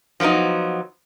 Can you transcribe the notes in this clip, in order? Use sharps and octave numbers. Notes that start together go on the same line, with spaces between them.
F3 F#3 A3 B3 D#4